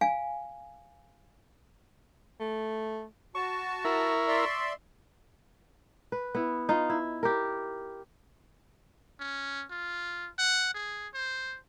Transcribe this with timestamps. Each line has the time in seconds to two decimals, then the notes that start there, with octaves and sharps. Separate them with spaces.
0.01 F5 G#5
2.40 A3
3.35 F#4 A5 C#6
3.85 E4 A#4
4.28 D5 E5 C6
6.12 B4
6.35 B3 E4
6.69 D#4 F4
6.90 E4
7.23 G4 A#4
9.19 C#4
9.70 F4
10.38 F#5
10.74 G#4
11.14 C5